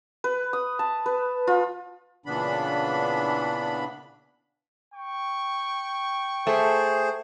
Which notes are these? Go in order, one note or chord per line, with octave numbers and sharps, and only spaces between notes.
B4
D#6
A5
B4
F4
A#2 C#3 E3 B3 D4 B5
G5 C#6
A3 G#4 C5